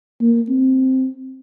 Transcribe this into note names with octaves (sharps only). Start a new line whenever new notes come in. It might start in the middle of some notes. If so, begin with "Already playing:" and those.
A#3
C4